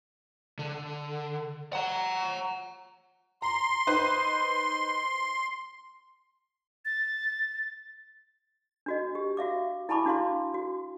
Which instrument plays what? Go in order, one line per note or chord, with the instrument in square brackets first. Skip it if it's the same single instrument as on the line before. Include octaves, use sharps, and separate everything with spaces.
[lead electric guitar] D3
F#5 A#5
[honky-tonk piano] A#5 [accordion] C6
[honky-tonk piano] D#4 B4 C5
[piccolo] A6
[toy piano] D4 F#4 D#5
G4
F#4 E5 F5 D6
E4 G#5 A5 B5 C#6 D6
D4 F#4 F5 C6
F#4